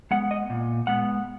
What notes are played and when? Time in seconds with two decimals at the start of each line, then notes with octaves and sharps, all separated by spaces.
0.11 G#3 B3 F#5
0.31 D#5
0.50 A#2
0.87 G#3 B3 F#5